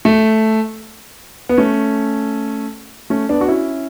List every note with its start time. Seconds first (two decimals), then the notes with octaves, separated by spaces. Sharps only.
0.05 A3
1.49 B3
1.58 A3 C#4
3.10 A3 C#4
3.29 B3 D4
3.41 F#4
3.48 C#4 E4